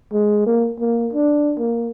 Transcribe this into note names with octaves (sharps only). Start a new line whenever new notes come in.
G#3
A#3
A#3
D4
A#3